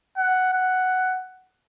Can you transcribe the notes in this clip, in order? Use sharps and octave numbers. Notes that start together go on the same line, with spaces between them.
F#5
F#5